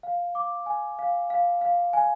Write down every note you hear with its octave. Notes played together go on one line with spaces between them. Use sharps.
F5
D6
G#5
F5
F5
F5
G#5